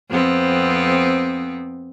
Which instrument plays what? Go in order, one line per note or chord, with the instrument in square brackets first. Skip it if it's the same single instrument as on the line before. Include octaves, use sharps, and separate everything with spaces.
[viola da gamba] F2 B3 C4